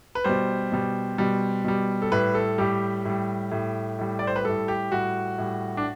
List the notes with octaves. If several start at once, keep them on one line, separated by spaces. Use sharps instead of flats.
B4
B2 G3 C5
B2 G3
B2 G3
B2 G3
A4
A2 G3 B4
A4
A2 G3 G4
A2 G3
A2 G3
A2 G3
D5
C5
B4
A2 G3 A4
G4
A2 G3 F#4
A2 G3
D4